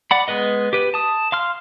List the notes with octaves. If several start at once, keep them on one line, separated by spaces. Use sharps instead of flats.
D5 F#5 B5
G#3 B3 B4 D#5
G4 B4
A5 D#6
F5 C6 F6